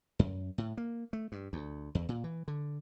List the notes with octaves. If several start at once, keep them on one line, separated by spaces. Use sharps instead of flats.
F#2
A2
A#3
A3
G2
D2
E2
A#2
E3
D3